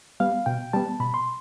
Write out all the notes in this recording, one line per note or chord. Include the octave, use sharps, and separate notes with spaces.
G3 B3 F5
B2 G5
G3 B3 A5
B2 B5
C6